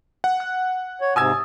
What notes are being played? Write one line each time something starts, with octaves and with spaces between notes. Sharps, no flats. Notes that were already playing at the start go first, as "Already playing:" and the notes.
F#5
F#6
C#5
G#2 C3 G#5 D#6 E6 G#6 A6